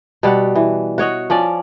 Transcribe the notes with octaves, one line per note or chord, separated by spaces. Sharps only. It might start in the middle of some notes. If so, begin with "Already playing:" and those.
B2 G3 F#4 F#5
E3
F#4 C#5 D#5 F#5
F3 C#4 D5